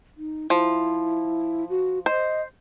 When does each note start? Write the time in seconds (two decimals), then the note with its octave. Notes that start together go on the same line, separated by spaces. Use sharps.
0.18 D#4
0.50 F3 E4
1.70 F#4
2.06 C5 D#5